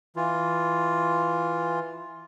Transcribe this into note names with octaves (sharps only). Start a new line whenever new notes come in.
E3 F4